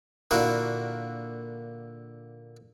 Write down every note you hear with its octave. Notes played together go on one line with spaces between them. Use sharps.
A#2 D3 A#3 E4 F#4 A#4